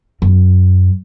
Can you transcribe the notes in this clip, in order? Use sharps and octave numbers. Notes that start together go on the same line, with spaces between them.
F#2